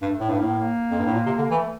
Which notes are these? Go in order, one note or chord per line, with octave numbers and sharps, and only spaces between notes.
G2 A3
A2
G2
A2 A#3
A#3
F2
G2
A2
A#2
C3
D3
E3 A3